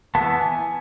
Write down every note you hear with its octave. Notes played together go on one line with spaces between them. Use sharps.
E3 B3 A5
G#5